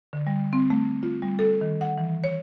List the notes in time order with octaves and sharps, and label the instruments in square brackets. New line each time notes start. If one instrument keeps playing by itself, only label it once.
[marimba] D3
G3
C4
A3
F4
G3
A4
D#3
F#5
E3
C#5